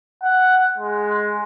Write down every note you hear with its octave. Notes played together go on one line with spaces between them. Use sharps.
F#5
G#3